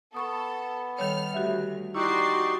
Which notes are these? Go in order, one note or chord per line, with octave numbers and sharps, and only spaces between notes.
B3 A4 B5 C#6 D#6
D#3 G3 A4 C#5 F6
D2 F#4 G4 E5
D#4 E4 F#4 G4 D5 C6 C#6